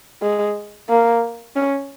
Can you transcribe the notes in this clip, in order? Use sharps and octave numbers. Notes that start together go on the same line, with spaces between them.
G#3
A#3
C#4